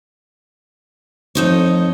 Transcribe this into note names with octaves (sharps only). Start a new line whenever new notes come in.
F2 D#4 C#5